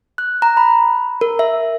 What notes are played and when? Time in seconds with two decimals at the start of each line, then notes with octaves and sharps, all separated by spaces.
0.18 F#6
0.42 A#5
0.57 B5
1.21 A#4
1.39 E5